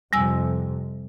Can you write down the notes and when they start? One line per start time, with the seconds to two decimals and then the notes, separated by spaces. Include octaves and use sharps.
0.13 F2 C3 G3 G#5 E6